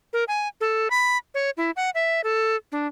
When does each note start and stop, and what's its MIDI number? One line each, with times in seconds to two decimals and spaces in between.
0.13 0.24 70
0.28 0.48 80
0.61 0.88 69
0.91 1.17 83
1.34 1.50 73
1.57 1.71 64
1.76 1.90 78
1.95 2.21 76
2.24 2.56 69
2.72 2.87 62